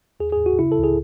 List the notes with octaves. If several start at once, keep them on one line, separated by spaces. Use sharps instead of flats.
D#2 G#4
G#4
D#2
F#4
C#3 E4
A4
C#2
G#4